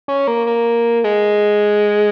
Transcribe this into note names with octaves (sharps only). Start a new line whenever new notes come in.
C#4
A#3
A#3
G#3